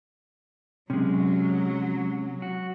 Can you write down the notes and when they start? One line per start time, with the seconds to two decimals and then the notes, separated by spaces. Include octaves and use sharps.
0.90 C3 F#3 G#3 C#4
2.42 F#4